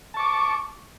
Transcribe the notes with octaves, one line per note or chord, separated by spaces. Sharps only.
A5 C#6 D6